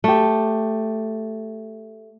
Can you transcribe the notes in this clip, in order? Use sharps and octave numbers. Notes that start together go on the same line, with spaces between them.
A3 G4